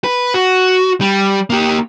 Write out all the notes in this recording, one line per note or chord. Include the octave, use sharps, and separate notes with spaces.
B4
F#4
G3
A#3 G4